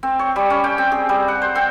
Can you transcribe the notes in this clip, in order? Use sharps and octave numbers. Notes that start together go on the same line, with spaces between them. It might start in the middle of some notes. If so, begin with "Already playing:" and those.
C4
C#5
G3
C#4
G5
C4
G#4
G3
F#5
C5
C4